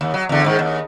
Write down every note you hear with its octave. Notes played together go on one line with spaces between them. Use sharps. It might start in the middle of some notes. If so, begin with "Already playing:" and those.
D#2
F#3
E2 D3
G#2 D#3
D#2